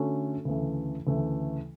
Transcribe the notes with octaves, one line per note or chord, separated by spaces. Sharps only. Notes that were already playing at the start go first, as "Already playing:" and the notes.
Already playing: D3 A3 C#4 F#4 A4
D2 C#3 E3 A3
D2 C#3 E3 A3